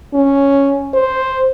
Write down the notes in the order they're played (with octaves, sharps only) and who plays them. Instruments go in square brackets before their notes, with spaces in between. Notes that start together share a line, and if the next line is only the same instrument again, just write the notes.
[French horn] C#4
C5